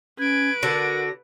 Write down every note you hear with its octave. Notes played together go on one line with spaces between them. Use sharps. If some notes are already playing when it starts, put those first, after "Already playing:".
C#4 B4 G#6 D7
D3 F#4 A#4 A#6